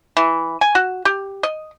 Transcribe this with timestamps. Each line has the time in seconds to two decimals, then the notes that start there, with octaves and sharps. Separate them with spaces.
0.17 E3
0.61 G#5
0.75 F#4
1.05 G4
1.43 D#5